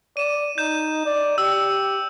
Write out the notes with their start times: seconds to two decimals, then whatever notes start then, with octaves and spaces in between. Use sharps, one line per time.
0.17 D5 D#7 E7
0.58 D#4 G6 E7
1.05 D5
1.38 G4 E6